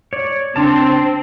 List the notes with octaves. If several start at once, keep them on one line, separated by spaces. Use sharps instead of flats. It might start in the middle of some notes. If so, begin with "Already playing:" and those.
C#5 D5
C#3 C4 D4 A5 C6